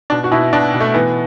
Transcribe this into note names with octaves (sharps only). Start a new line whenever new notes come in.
B2 D4
F#4
B2 E4
B2 D4
B2
A3
E3 B3